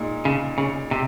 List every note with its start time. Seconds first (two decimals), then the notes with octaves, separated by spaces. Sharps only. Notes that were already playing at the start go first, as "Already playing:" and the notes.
Already playing: A#2 G#3 D#4
0.25 C#3
0.58 C#3
0.91 C3